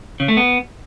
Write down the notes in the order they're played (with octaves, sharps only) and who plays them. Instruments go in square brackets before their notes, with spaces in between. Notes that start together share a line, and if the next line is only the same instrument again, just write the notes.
[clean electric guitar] C#3
A3
B3